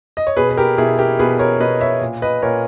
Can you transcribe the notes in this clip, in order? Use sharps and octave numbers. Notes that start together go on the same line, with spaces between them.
D#5
C#5
B2 G#4 B4
B4
G4 A#4
B2 E4 G#4
G4 A#4
B2 G#4 B4
A#4 C#5
B2 B4 D#5
C#5 E5
A#2
B4 D#5
A#2 A#4 C#5